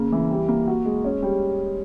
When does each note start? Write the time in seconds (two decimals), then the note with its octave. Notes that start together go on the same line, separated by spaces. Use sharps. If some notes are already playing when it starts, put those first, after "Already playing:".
Already playing: C#3 A#3
0.12 E3
0.31 G3
0.48 A#3
0.67 F#4
0.85 G#3
1.04 C#4
1.22 G3